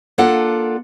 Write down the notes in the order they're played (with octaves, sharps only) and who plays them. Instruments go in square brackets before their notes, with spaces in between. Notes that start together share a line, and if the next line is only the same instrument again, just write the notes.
[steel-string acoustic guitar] A#3 D4 F4 A4 D5 F#5